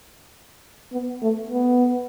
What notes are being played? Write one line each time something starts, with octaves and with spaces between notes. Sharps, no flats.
B3
A3
B3